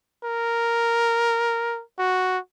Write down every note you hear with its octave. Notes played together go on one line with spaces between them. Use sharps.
A#4
F#4